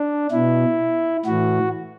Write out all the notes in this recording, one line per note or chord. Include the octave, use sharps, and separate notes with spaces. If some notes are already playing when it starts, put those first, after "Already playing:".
Already playing: D4
B2 E4
A2 E3 F#4